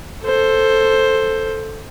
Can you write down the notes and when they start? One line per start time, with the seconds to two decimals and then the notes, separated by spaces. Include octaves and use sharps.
0.24 A4 C5